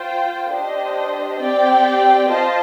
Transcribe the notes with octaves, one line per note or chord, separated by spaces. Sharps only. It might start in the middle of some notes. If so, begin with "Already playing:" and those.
Already playing: F4 C5 G5
D4 G4 C5 D#5
C4 G4 D5 G5
F4 C5 D#5 A5